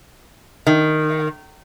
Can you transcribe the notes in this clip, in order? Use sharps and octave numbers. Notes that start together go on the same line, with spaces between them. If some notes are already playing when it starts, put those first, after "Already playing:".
D#3